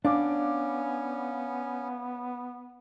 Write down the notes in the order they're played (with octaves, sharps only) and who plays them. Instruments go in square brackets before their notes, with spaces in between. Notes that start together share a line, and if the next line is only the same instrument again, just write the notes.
[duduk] B3 [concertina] C#4 [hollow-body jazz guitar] D4 [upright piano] F5 D6